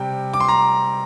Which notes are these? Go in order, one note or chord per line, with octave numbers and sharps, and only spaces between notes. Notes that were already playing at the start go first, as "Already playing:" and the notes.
Already playing: C3 G3 G5
D6
C6
A#5